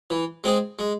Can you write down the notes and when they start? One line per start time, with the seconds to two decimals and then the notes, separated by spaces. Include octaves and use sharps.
0.10 E3
0.44 G#3 C4 G#4
0.79 G#3